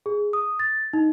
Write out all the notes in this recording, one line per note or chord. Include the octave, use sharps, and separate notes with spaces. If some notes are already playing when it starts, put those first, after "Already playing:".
G#4
D#6
A6
D#4